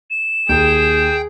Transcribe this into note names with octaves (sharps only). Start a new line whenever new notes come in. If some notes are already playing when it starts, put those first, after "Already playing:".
E7
D#2 G#4 G5 G6